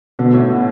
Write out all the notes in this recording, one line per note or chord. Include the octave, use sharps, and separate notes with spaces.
B2 D3
A2
B2